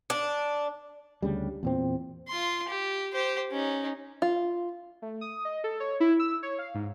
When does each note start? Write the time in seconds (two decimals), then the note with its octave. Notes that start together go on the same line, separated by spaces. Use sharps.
0.10 D4
1.22 D2 C#3 G3
1.63 E2 A#2 C4
2.28 F4 C6
2.68 G4
3.13 G4 C5
3.51 C#4 D#4
4.22 F4
5.02 A3
5.21 D#6
5.45 D#5
5.64 A4
5.80 C#5
6.00 E4
6.19 E6
6.43 C#5
6.59 F5
6.75 G#2